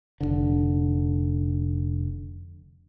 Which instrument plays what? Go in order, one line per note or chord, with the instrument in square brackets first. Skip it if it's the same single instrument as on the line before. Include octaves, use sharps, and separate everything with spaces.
[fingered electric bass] F1 A#1 D3